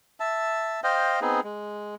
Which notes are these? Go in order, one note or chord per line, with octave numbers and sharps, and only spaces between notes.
E5 A5
C5 D#5 F5 G5
B3 C4 D#4 G#4
G#3